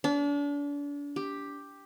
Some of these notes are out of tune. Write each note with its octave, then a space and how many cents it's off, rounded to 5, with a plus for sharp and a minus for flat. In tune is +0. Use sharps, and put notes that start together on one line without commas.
D4 -35
G4 +5